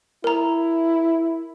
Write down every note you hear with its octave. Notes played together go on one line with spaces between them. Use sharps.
E4 A#4 A#5